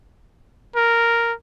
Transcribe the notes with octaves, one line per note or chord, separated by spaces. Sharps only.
A#4